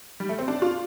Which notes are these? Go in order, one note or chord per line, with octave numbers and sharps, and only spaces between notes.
G3
A3
C4
D4
F4